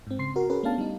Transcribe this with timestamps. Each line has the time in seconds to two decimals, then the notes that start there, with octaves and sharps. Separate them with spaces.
0.07 G#2 C4
0.19 C#3 C6 C7
0.36 F#4 A#4
0.50 C#4 F#4 G#4 A#4 B4
0.63 A3 B3 C#4 D4 F5 A5
0.78 G3 D#4